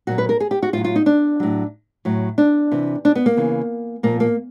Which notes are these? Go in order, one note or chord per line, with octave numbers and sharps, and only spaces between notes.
A#2 F#3 F#4
B4
A#4
G#4
G4
F#4
A2 F#3 F4
F4
D#4
D4
A2 F#3
A2 F#3
D4
C3 E3
D4
B3
A#3
C#3 E3
A#2 F3 A#3
A#3